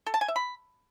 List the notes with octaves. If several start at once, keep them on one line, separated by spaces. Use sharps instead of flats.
A4
A5
G#5
E5
B5